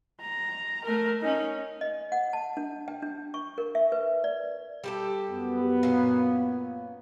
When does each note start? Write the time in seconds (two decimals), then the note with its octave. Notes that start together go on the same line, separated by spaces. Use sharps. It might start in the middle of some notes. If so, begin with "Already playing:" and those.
0.21 A#5
0.85 A3 A#4
1.22 C#4 D#4
1.81 D#5
2.12 F#5
2.33 A5
2.57 D4
2.88 G5
3.02 D4
3.34 C#6
3.58 A#4
3.75 E5
3.92 B4
4.24 D5
4.84 G3 G4 A4
5.30 F#2 B3
5.83 A#2 C#4